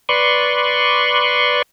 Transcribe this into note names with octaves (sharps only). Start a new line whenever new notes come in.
B4 D5 C6 C#6